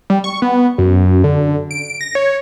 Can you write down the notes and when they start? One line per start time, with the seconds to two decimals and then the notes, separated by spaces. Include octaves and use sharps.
0.10 G3
0.24 C#6
0.42 B3
0.78 F#2
1.24 D3
1.71 D7
2.01 A#6
2.15 C#5